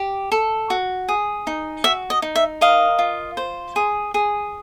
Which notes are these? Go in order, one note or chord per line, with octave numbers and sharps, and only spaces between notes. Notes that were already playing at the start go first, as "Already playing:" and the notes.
Already playing: G4
A4
F#4
G#4
D#4
F#4 E5
D#5
D#4
E5
A#4 D#5 F5
F4
C5
G#4
G#4